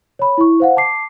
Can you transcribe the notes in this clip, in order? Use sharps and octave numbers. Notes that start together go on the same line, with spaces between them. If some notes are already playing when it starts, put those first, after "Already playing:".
C#5 B5
E4 C#6
C5 F5 F#5
A5 D6 C7